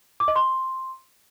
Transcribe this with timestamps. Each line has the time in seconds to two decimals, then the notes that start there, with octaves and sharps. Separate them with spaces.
0.20 D6
0.28 D#5
0.36 C6